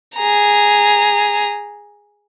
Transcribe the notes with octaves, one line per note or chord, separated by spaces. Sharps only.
G#4 A#5